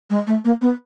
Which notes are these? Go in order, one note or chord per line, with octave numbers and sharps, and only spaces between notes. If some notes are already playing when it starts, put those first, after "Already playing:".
G#3
A3
A#3
B3